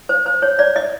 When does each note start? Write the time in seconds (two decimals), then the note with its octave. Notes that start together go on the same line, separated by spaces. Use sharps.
0.09 C5
0.26 C5
0.42 C#5
0.59 D5
0.76 D#5